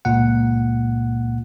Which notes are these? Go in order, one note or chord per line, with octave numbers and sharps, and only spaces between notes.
C#2 A#2 F#5